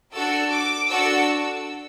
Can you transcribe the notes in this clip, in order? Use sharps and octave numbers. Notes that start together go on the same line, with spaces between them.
D4 F#4 A4 E6
D6
D4 F#4 A4 E6